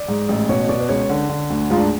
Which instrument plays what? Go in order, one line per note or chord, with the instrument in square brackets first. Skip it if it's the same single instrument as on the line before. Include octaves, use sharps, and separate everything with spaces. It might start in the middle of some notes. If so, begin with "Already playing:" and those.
Already playing: [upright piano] D5
G#2
A1
B2 C#5
B2 D5
B4
C#2 C#5
D3
D3
D2
G#2 F4
D4